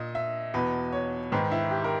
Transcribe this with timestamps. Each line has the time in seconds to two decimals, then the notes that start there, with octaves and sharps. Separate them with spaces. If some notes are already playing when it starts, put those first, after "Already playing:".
Already playing: A#2 D#5
0.15 E5
0.54 E2 B2 B4
0.92 C#5
1.32 G#2 D#3 B4
1.51 E4
1.71 G4
1.84 A#4